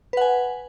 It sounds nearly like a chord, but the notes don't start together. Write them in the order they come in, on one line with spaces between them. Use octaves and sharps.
B4 F#5 G#5